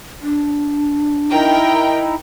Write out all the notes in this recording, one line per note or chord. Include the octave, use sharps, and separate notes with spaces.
D4
D#4 E4 A#4 G5